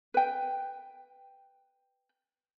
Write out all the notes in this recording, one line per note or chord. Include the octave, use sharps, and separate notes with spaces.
B4 G5